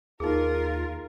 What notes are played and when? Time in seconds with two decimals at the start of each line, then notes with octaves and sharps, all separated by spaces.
0.20 D#2 D#4 F4 G#4 A#4